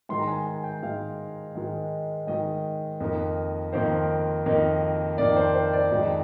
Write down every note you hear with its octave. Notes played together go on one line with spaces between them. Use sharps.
G#2 D#3 G#3 C6
A#5
G#5
G#5
G5
G#2 D#3 G#3 F5
G#2 D#3 G#3
G#2 D#3 G#3 D#5
F2 D#3 A#3 D#4
F2 D#3 A#3 D#4 C5
F2 D#3 A#3 D#4
F2 D#3 A#3 D#4 D5
C5
C5
D5
F2 D#3 G#3 D#4